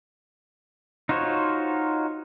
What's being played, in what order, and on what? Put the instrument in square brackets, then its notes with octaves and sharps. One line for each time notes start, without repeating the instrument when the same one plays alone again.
[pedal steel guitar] D#4 F4 F#4 C5 C#5